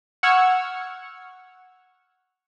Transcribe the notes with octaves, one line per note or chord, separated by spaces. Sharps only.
F#5 C#6 E6 F6 G#6